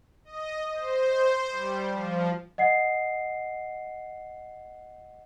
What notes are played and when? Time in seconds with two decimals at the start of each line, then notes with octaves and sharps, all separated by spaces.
0.25 D#5
0.73 C5
1.51 G3
1.87 F3
2.58 D#5 F#5 C7